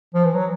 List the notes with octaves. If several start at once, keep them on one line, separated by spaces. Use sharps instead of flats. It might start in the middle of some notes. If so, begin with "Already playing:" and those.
F3
E3
F#3